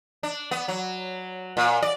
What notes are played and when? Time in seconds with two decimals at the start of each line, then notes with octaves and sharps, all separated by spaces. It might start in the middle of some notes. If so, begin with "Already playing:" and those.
0.23 D4
0.51 B3
0.68 F#3
1.57 A#2
1.82 D5